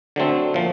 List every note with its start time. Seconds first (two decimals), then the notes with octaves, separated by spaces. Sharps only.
0.16 D3 F#3 A3 C4
0.54 A#2 F3